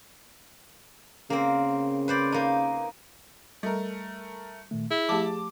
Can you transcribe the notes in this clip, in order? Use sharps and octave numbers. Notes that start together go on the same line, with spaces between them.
C#3 A#3 C4
B4 C5 D5
A#3 D#4
G3 A3 A#4
A#2 D#3 A3
E4 G#4
F3 A3 G4 A5 D6